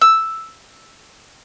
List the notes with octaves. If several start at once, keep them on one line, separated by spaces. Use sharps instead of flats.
E6